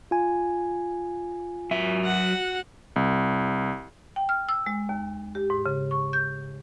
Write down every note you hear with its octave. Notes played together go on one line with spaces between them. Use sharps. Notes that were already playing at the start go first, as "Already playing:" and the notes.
F4 G#5
F#3 E5
F#4 F#5
C2
G5
F6
E6
G#3
D#2
G4
G#2
C#3
C#6
G6